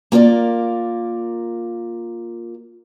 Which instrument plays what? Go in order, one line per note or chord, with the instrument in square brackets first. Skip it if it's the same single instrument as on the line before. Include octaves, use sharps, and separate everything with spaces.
[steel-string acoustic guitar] A#3 F4 A#4 D5